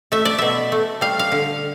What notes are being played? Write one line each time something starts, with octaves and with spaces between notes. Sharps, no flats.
A3 E5
D5
B2 E5
A3
G3 F5
F5
D3